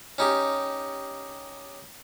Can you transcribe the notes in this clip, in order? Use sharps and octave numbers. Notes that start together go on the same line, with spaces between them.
C#4 D#4 G4